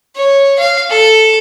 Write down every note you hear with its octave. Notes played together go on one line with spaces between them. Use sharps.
C#5
F5
A4